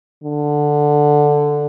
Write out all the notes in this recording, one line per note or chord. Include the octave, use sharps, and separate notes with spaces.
D3